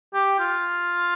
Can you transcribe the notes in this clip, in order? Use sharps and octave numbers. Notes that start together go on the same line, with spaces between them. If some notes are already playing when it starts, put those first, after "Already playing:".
G4
F4